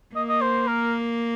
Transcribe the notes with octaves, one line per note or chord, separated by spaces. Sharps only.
A#3 D#5
D#5
C5
A#4